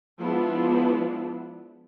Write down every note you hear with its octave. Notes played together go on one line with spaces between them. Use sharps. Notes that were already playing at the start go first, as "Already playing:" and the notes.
F3 G#3 B3 D4 E4